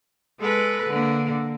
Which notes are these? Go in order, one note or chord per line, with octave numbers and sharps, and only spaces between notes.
G#3 A4 B4
D3 A#3